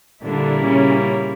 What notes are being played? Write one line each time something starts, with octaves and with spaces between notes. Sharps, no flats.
A#2 D3 G3 A#3 D4 E4
C#3 C#4